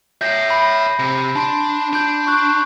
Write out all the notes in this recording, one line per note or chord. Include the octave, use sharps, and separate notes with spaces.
C#5 E5 G6 A#6 C7
B5
C3
D4 A5 C6 D7
D4 G6 D7
C#6 F#6